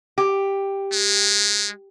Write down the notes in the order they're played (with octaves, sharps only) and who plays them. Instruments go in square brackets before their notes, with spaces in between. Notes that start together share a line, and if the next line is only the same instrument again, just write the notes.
[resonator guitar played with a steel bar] G4
[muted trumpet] G#3